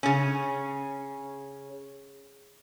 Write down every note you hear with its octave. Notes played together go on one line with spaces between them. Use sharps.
C#3 C#4